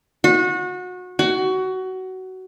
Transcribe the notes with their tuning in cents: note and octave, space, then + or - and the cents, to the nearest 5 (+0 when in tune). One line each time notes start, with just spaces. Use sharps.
F#4 -30
F#4 +20